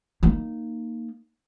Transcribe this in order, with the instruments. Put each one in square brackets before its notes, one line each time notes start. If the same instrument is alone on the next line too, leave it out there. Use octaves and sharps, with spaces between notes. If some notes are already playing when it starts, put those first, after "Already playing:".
[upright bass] A#3 D#4